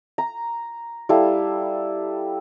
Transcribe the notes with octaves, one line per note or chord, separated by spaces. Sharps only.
A#5
G3 E4 A4 F5